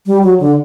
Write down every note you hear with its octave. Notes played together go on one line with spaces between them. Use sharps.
G3
F#3
D3